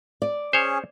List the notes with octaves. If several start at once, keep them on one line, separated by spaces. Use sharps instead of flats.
D5
C#4 G#4 C5 C#5